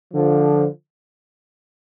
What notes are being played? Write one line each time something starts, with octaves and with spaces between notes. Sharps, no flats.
D3 F3